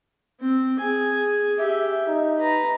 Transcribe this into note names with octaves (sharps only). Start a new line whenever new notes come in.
C4
G#4 G#5
G4 E5
D#4
B4 A#5